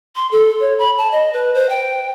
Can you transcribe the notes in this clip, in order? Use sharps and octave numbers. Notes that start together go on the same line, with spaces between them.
C6
A4
C#5
B5
A5
D#5
B4
C5
G5